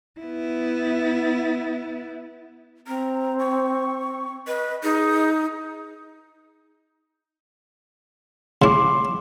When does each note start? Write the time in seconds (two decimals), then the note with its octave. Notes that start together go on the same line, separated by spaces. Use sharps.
0.20 B3 E4
2.87 C4 A#5
3.39 C#6
4.47 B4 D#5
4.83 D#4 G#4
8.62 C#3 E4 C6 D6